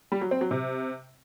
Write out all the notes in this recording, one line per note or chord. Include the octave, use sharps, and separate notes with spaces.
G3
F#3
C4
F#3
C3